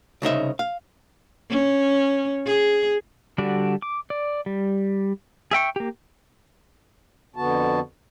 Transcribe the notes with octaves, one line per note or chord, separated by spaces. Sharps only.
C2 C#3 D#4 E5
F5
C#4
G#4
D3 G3 D4 F#4 D5
D6
D5
G3
G#4 E5 G5 C#6
A#3 G4
F2 D3 B3 F#4 A5